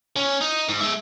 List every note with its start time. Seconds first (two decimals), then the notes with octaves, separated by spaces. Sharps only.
0.16 C#4
0.41 D#4
0.68 G#2
0.81 G#3 E5